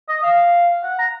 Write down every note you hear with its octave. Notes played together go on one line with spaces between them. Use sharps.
D#5
F5
F#5
A#5